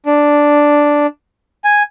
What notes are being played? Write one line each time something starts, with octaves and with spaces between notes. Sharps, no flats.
D4
G#5